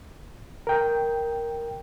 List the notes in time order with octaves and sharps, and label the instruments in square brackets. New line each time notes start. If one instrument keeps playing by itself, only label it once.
[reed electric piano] A#4 G5